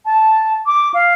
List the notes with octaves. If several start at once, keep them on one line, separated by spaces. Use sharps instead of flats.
A5
D6
F5